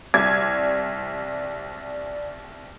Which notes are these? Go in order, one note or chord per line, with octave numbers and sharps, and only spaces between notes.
C2 D5 G#6